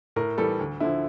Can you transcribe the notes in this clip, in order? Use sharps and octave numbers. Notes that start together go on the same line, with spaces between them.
A2 A#4
E3 G3 A4
D2
D3 F3 E4